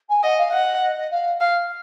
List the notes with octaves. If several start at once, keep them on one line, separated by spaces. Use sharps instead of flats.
G#5
D#5 F#5
F5
D#5 F#5
D#5
D#5
D#5
F5
F5